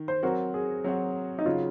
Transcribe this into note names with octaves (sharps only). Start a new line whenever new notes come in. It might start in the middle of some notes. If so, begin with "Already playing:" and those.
Already playing: D#3
C5
F#3 C4 F#4 A#4
G#4
F#3 C4 F#4
D#4
C#3 F#3 F4